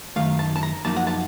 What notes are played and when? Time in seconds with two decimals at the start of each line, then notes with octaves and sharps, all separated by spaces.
0.16 F#2 D#3 A3 F5
0.39 A5
0.56 A5
0.63 A#5
0.85 F#2 F3 A#3 D#4 A5
0.97 F#5
1.07 A5